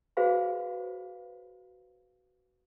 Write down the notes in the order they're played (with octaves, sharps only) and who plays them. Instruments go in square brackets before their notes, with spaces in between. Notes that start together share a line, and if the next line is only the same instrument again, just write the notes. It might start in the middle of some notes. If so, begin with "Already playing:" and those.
[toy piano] F#4 G#4 B4 C5 F5 B5